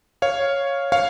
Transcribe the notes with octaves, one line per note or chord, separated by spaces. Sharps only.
C#5 F5
C#5 F5